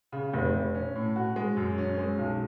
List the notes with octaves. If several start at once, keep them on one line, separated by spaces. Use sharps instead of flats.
C#3
F1
F1
C#4
A2
F#4
G#3
F#2
C#4
G#3
B1